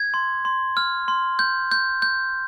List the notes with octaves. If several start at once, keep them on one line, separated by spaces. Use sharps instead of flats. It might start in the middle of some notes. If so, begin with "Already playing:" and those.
Already playing: G#6
C6
C6
F6
C6
G6
G6
G6